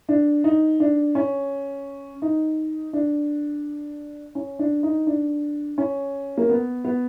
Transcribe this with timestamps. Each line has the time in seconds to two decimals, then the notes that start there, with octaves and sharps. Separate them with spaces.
0.09 D4
0.44 D#4
0.80 D4
1.15 C#4
2.22 D#4
2.93 D4
4.35 C#4
4.59 D4
4.83 D#4
5.07 D4
5.78 C#4
6.37 A#3
6.49 B3
6.85 B3